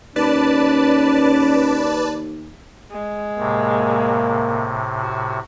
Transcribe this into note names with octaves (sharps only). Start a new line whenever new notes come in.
D#2 C#4 B4 D5 A5
G#3
A2 C3 A#3
F#4